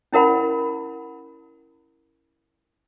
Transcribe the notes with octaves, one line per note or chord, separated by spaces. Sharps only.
C#4 E4 A#4 F#5 B5